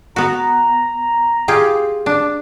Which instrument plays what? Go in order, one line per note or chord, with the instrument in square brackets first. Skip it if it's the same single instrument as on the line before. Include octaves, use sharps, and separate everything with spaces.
[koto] B3 F#4 [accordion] A#5
[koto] F4 G4 G#4
D4